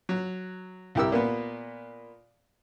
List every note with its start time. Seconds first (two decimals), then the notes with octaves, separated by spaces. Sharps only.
0.09 F#3
0.95 C2 E4 G4 A#4 E6
1.12 A#2 A#3 B3